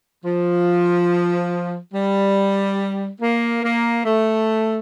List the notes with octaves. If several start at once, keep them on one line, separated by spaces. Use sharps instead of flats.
F3
G3
A#3
A#3
A3